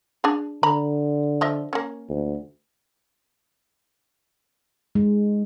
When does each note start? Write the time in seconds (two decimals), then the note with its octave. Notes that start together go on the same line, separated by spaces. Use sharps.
0.24 D4 G#4
0.63 D3 A#5 B5
1.41 F3 D#5 E5
1.73 A#3 C#4
2.09 D2
4.95 G#3